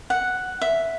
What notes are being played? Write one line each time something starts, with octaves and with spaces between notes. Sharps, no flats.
F#5
E5